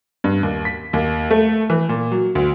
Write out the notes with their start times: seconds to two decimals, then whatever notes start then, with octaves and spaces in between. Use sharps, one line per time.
0.24 G2
0.43 D#2
0.65 B6
0.93 D#2
1.30 A3
1.70 E3
1.89 A#2
2.12 F#3
2.35 D2